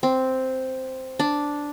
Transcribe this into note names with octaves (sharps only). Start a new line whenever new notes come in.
C4
D4